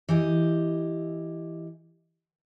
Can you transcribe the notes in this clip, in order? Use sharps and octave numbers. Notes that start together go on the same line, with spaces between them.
E3 G4 D#5